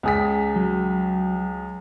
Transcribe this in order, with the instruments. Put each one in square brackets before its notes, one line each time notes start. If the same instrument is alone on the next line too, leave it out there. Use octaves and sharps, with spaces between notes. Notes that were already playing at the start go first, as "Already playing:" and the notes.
[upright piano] C#2 G#4 B6
[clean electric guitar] F#3